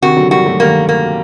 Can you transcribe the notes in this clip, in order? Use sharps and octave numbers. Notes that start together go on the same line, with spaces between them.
C3 D#3 F#4
D3 F#3
D#3 G3 F#4
F#3 A3
D#3 G3 A#3
A#3